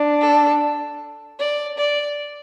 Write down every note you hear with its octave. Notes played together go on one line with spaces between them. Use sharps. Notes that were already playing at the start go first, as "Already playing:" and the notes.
Already playing: D4
A4
D5
D5